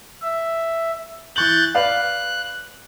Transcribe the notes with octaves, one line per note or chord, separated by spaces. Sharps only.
E5
E3 C#6 F#6 G6 A6 F#7
B4 D5 F5 F#6